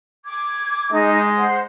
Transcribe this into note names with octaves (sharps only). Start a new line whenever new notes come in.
D6 G#6
G#3 D#4 D#5
C5 F#5